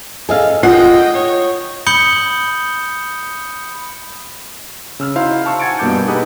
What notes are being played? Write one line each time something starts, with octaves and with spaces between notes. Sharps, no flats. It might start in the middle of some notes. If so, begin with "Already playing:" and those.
G#4 A4 D#5 F5
F4 D#5 F#5 G5
C#5
B5 D#6 G6 C#7 F#7 G7
C#3 E6 F6
D#4 E4 F#4 C5 F5
F5 A5 C#6 E6
F#5 G#5 G#6 A6 C#7 D7
G2 B2 A#3 A5 D6 G6
D#4 G4 G#4 B4 F#5 D#6